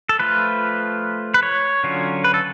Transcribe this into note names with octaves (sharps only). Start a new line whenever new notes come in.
A4
F3 A3 F4 B4
B4
C#5
D3 F#3 C#4 F4
B4
A4